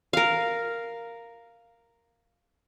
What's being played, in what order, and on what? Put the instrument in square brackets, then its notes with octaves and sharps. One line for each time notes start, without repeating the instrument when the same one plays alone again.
[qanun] A#4 F5